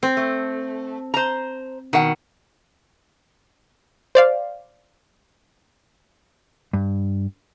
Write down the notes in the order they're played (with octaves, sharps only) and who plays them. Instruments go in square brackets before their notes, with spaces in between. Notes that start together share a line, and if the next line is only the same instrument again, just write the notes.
[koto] C4
[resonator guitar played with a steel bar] A3
C5 A#5
[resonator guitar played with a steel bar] B2 F#5 [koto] D#3
[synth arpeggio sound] C5 D5 F5
[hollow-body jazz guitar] G2